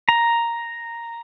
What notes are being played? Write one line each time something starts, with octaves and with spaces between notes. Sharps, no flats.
A#5